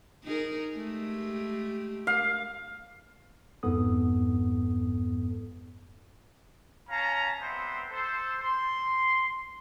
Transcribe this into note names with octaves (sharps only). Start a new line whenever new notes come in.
D#4 G#4 A#4
G#3 A3 G4
F5
G1 F2 G#2 B3 A4 D#6
C#4 F5 A5 A#5
G3 B3 C4 C5 E5
A4 C5
C6